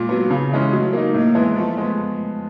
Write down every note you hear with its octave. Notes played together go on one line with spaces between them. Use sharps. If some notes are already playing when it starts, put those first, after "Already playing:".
Already playing: A#2 G#3
F#3 B3
C#3
E3 G#3 C#4
F#3 A3
A#3 D#4
A2 A#3
E3 G#3 B3 E4
F3 A3
G#3 B3